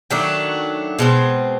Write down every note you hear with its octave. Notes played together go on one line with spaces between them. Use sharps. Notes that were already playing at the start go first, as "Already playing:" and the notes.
D#3 F#3 A3 D4
B2 G#3 C4